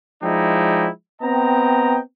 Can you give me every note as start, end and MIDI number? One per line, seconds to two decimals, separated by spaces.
0.23 0.89 53
0.23 0.89 56
0.23 0.89 63
0.23 0.89 64
0.23 0.89 74
0.23 0.89 79
1.22 1.99 59
1.22 1.99 60
1.22 1.99 75
1.22 1.99 79
1.22 1.99 82